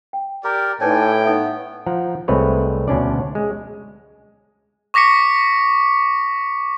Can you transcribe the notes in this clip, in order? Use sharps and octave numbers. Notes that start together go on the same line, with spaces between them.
G5
G4 A#4 D5 C6
A2 D4 D#4 A4 B4 C#5 G5 G#5
B3 D#4 E5
F3 F#5 A#5
C2 G#3 A3 C4 B4 C#5
D2 B2 C#4 D4 D5
G#3
C#6 D6 A#6 B6 C#7